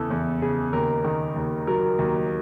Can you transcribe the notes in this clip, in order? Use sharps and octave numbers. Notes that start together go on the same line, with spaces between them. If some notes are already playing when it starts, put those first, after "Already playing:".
Already playing: E2 C#3 E3 A4
E2
C#3 G#4
D#2 A#4
D#3
D#2
F#3 A#4
D#2